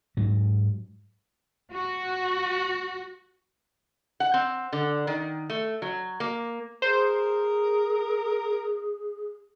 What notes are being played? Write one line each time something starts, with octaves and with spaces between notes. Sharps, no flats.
G#2 F#3
F#4
F#5
C4
D3
D#3
A3
F#3
A#3
G#4 A#4 C5